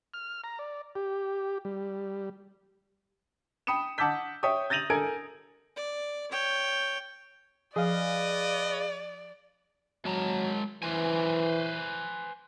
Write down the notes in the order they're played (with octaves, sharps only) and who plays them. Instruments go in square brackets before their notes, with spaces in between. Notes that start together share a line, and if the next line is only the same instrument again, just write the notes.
[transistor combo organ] F6
A#5
D5
G4
G3
[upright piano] G5 B5 D#6 C#7 E7
F#5 A5 D6 E6 G6 B6
C#5 E5 G5 C#6 D#6
G6 A6 A#6 D#7 F7 F#7
A4 A#4 G#5 G#6 D7
[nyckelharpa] D5
C#5 G5
[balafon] F3 [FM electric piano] G#4 F5 [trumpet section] B4 D#5 [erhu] D5
[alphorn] F#3 [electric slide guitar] G#3 A5 A#5
[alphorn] E3 [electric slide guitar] B4 C5 G#5